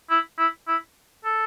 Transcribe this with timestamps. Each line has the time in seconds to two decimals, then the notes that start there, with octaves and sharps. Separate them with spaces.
0.10 E4
0.38 E4
0.67 E4
1.24 A4